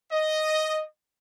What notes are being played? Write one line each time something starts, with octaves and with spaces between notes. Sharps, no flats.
D#5